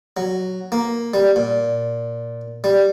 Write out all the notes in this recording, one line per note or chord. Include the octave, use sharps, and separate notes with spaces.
F#3
A#3
G3
A#2
G3